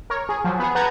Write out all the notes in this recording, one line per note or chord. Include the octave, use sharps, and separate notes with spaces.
A#4 C#5
G#4
F3 F#3
B3 G#4
B4 F#5 A5 A#5 G6 G#6